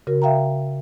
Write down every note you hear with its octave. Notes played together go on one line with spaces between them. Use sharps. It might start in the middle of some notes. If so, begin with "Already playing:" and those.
C#3 F#4 A#4
E5 F5 G5 A#5